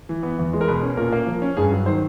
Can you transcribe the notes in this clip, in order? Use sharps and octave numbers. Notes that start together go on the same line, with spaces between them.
E3
B3
E2
G#3
A#4
B2 B4
C#4
A#2 A#4
A#3
F3
C#4
G2 G#4
F#3
D#3 C5